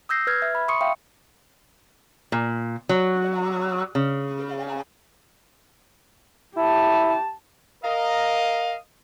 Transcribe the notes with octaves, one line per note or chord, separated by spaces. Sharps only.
D#6 E6 G6 A#6 C7
B4 F6 G#6
E5
B5
C6 C#6 D#6 C#7
E5 F5 G5
A#2
F#3
C#3
E4 G4 A5
A#4 D#5 F5